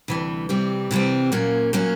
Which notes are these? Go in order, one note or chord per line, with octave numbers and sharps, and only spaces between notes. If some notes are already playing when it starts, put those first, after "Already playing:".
D2 C3 E3 G3
C3 E3 G3 C4
C3 E3 G3 C4
A#2 F#3 A#3 C#4
A#2 F#3 A#3 C#4